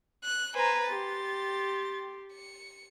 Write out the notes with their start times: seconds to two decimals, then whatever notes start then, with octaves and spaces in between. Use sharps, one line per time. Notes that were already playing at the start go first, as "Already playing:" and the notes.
0.24 F#6
0.55 B4 C5 G#5 A#5
0.89 G4 C6 A6
2.33 C#7